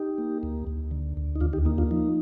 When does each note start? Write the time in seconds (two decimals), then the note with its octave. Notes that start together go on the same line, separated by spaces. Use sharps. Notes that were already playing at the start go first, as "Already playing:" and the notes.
Already playing: D#4 G4
0.18 A#3
0.43 D2
0.67 D2
0.91 D3
1.17 D2
1.36 D#4
1.41 D#2 D4 F4
1.53 D#4 G4
1.65 A#3 D#4
1.78 D4 F4
1.91 F3 D#4